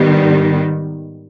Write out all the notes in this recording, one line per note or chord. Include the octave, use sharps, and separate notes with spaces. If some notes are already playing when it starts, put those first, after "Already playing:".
Already playing: G#2 D#3 G3 B3